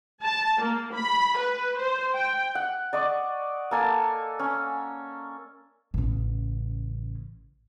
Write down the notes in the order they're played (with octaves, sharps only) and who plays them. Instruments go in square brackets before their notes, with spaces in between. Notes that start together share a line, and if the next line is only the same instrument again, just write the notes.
[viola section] A5
A#3
B5
B4
C5
G5
[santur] F#5
D5 D#5 C#6
A#3 A4 G#5
C#4
[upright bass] A1 C#3